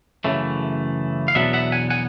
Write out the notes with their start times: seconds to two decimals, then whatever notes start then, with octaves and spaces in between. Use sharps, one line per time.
0.24 F#2 C#3 E3 A3
1.28 F5
1.35 E2 B2 F#3 B3 D4 E5 F#5
1.53 E5 F#5
1.72 F#5 G#5
1.90 F#5 G#5